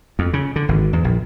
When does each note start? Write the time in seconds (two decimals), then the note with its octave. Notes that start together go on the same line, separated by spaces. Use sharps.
0.19 F2
0.33 C#3
0.56 D3
0.69 G#1
0.93 E2
1.04 A#1